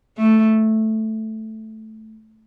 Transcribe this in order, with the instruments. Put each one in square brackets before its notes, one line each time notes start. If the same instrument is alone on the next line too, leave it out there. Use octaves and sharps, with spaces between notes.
[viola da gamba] A3